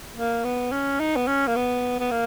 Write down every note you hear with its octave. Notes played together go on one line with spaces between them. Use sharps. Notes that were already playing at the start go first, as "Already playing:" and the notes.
A#3
B3
C#4
D#4
B3
C#4
A#3
B3
B3
A#3